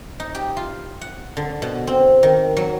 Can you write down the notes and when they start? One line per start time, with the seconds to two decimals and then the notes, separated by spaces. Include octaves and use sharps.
0.20 D#4
0.35 G4
0.57 F4
1.01 F#5
1.37 D3
1.62 B2
1.87 C4
2.23 D#3
2.57 F#3